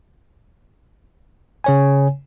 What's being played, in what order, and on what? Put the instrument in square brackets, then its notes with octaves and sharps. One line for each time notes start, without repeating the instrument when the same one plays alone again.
[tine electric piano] C#3 C#5 G#5